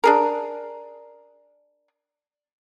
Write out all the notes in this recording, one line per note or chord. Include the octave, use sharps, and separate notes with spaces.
D4 G#4 A#4